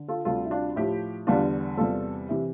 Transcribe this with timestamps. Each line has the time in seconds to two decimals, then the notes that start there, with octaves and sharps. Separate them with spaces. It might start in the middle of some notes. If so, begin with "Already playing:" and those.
Already playing: D3
0.08 F4 A4
0.25 D2 C3 G3 F4 A4
0.45 E4
0.51 D4 F4
0.76 A2 F3 E4 G4
1.27 E2 D3 G3 D4 F4
1.77 E2 C3 G3 F4 A4
2.29 C3 E3 E4 G4